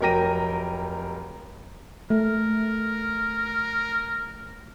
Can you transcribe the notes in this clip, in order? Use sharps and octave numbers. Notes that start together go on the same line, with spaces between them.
F1 F#3 A#4 G5 A#6 D#7
A3 A#4